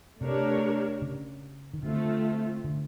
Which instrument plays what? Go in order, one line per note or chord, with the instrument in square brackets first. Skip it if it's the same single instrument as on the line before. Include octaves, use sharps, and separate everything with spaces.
[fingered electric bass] C3 [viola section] A3 D4 G4 A#4 C#5
[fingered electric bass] C#3
D#3
[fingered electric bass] D3 [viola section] A3 C4 F4
[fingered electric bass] D3